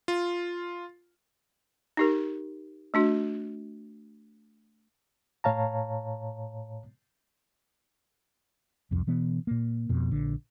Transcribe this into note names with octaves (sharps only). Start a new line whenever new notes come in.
F4
D#4 G4 A#4
A3 D4 F#4
A2 C#5 F5 A5 A#5
C2 F2
B2 E3 B3
A#2 A#3
F2 B2
A#1 D3